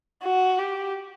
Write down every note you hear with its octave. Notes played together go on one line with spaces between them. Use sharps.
F#4
G4